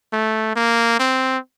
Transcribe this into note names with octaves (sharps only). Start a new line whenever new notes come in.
A3
A#3
C4